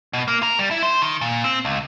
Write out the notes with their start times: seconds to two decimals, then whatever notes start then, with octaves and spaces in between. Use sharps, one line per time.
0.13 B2
0.28 A#3
0.43 A#4
0.59 G3
0.71 E4
0.83 C5
1.02 D#3
1.21 A#2
1.44 C4
1.65 C#2